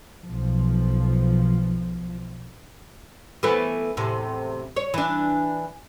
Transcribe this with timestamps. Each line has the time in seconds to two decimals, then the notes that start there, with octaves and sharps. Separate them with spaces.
0.25 B1 F3
3.43 E3 A3 B3
3.97 E2 A2 C3
4.76 C#5
4.94 E3 D4